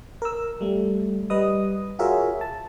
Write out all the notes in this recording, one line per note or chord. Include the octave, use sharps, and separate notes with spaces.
A#4 E6
G3 A3
G3 B4 D#5 D#6
F4 F#4 G#4 A#4 C#5 E5
A5